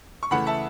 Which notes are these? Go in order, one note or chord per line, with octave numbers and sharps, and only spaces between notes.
C#6
C#3 E3 A3 F#5 B5
E5 A5